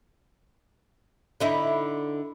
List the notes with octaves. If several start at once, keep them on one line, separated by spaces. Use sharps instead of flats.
D3 D#4 E4